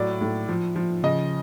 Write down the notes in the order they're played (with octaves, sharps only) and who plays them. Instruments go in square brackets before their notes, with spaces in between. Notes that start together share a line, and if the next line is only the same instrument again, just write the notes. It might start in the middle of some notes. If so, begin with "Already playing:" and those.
Already playing: [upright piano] A2 F#3 D5
A2
F3
F3
C#3 D#5